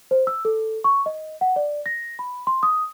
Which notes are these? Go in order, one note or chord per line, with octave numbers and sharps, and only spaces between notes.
C5
E6
A4
C#6
D#5
F#5
D5
A#6
B5
C6
D#6